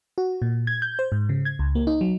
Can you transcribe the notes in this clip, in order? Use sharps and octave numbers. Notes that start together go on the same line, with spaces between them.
F#4
A#2
G#6
G6
C5
G#2
C#3
G#6
C#2
A#3
D#4
F#3